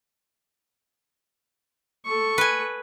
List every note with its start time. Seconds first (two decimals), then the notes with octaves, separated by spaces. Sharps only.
2.05 A4 C#6
2.38 B4 G#5